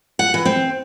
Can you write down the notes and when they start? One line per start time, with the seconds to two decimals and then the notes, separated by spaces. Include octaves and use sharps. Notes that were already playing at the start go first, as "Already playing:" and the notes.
0.19 F#5
0.34 E3
0.45 C4